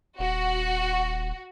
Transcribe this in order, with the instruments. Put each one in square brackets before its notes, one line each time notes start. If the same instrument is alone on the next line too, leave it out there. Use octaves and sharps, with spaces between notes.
[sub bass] D#1 [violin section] F#4